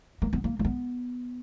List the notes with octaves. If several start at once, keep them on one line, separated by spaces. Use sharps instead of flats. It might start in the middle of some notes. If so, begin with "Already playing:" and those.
A#3
B3
A#3
A#3
B3